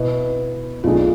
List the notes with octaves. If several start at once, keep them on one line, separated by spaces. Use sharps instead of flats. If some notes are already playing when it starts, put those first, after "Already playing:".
Already playing: B2 B3 E4 B4
B1 B2 A3 D4 F4 G#4